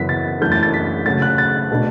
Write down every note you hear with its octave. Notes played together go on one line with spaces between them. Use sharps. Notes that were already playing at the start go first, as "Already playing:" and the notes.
Already playing: F#2 C#3 E3 B3 B6
A6
F#2 E3 A3 D4 G6
A6
A6
B6
C#3 F#3 A3 A6
F#6
A6
B2 A3 D4